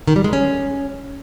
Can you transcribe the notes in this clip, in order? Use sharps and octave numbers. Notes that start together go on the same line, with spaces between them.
D#3
G3
G#3
C#4